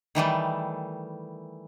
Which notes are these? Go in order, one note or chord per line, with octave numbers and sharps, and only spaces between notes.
D#3 E3 G3 A3